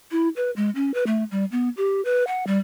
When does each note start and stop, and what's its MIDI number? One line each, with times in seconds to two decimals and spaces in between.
0.11 0.28 64
0.36 0.51 71
0.56 0.70 56
0.75 0.93 61
0.94 1.04 71
1.07 1.24 57
1.31 1.45 55
1.52 1.69 59
1.77 2.01 67
2.05 2.26 71
2.27 2.46 78
2.47 2.58 55